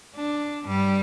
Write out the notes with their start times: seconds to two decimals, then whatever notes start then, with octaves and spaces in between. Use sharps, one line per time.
0.16 D4
0.64 G2 G3